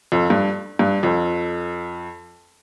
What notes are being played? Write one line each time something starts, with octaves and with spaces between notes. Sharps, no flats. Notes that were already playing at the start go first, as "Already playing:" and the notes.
F2
G2
G2
F2